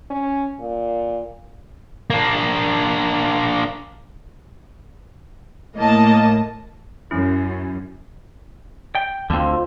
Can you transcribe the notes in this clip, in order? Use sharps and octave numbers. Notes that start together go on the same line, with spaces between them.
C#4
A#2
A#3 D4
A2 A#3 D#5 A5
F#2 C#4 E4
G5
D2 D3 D#3 C4 F4 C5